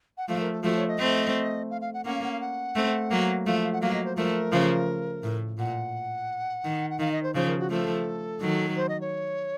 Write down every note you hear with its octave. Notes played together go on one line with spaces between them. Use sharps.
F#5
F3 A3 F5
A#4
A4
F3 A3 F#4
C#5
D#5
A3 C4
F5
F5
F#5
A#3 C#4 F#5
F5
F#5
F5
F#5
A3 C4
F#3 A#3
F3 A3 F5
F5
F#5
F#3 A#3 F5
D#5
C5
F3 A3 A#4
C#3 F3
A2
A#2 F#5
D#3
F#5
D#3 F5
D#5
C5
C#3 F3 C5
A#4
F#4
F3 A3 A4
D#3 F#3
C5
D#5
C#5